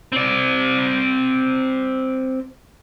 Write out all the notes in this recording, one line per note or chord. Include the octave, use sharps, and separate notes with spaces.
C4 D5